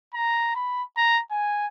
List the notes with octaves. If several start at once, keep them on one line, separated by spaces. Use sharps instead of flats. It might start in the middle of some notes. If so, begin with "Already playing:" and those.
A#5
B5
A#5
G#5